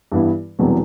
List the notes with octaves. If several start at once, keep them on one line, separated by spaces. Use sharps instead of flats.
G2 E3 B3 E4
E1 E2 C3 F#3 B3